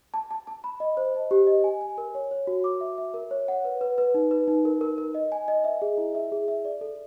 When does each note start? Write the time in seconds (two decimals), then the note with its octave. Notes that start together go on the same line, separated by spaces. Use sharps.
0.14 A5
0.31 A5
0.47 A5
0.64 B5
0.80 D#5
0.97 C5
1.14 D#5
1.31 G4
1.47 D#5
1.64 G#5
1.81 G#5
1.98 A#4
2.15 C#5
2.31 C#5
2.47 F#4
2.64 D6
2.81 E5
2.98 E5
3.14 A#4
3.31 C#5
3.48 F#5
3.65 B4
3.81 B4
3.98 B4
4.14 D#4
4.31 B4
4.48 D#4
4.65 A#4
4.81 A#4
4.98 A#4
5.15 D#5
5.32 G#5
5.48 D#5
5.64 E5
5.82 G#4
5.98 E4
6.15 E5
6.32 G#4
6.48 E5
6.65 D5
6.81 A4